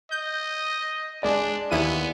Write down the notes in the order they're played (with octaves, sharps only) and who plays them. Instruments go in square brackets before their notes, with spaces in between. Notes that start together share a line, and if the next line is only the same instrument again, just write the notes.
[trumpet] D#5 [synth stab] G6
[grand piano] G#3 D5 [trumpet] D4
[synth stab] D#2 E4 D#7 [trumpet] B3